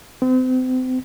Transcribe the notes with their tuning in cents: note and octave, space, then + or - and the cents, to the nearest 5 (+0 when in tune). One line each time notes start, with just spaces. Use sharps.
C4 -35